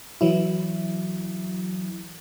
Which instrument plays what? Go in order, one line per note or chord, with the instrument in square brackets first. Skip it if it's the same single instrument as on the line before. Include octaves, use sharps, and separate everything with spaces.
[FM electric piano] E3 F#3 E4